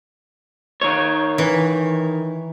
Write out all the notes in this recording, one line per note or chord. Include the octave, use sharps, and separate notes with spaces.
D#3 C#5
E3